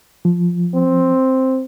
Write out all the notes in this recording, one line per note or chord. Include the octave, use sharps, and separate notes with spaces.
F3
C4